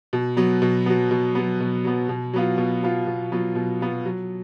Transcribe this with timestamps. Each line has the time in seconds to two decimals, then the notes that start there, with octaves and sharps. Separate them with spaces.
0.13 B2
0.37 F#3 B3
0.62 B2
0.86 F#3 B3
1.11 B2
1.35 F#3 B3
1.60 B2
1.85 F#3 B3
2.09 B2
2.33 F#3 B3 F4
2.58 B2
2.83 F#3 B3 F4
3.07 B2
3.32 F#3 B3 F4
3.55 B2
3.81 F#3 B3 F4
4.05 F#3